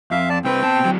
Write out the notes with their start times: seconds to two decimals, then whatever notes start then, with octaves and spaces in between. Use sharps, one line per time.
0.11 F2 E5 F5
0.30 D5 A5
0.44 C2 C4 B4 G5
0.63 B2 A5
0.85 D2 F#3